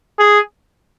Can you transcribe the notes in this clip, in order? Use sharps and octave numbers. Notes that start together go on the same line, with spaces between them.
G#4